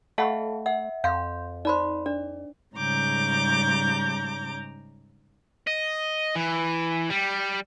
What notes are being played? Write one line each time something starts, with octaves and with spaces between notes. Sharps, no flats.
A3 A4 D#5 F5 F#5 A5 B5
E5 F#5
F2 F5 C6 G6
D#4 C5 D5 B5 C6
D4 D5
G#2 C#3 G3 A#5 D6 G6
D#5
E3
G3